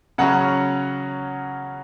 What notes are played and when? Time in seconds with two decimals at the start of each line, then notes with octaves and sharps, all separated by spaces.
0.18 C#3 F#3 C#4 F#5